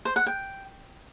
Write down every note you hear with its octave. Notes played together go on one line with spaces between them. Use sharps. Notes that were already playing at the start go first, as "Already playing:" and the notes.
C5
F#5
G5